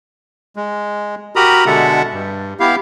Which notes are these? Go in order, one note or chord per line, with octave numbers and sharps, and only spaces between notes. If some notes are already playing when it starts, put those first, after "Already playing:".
G#3
F#4 G4 A#4 A#5 B5 D#6
B2 D3 G#3 A4 E5 F#5
G2
B3 E4 G4 F5